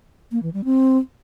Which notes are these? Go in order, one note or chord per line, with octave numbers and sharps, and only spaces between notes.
A#3
E3
G3
C4